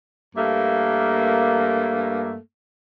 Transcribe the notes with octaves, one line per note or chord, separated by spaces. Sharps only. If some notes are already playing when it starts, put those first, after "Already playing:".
G2 A3 A#3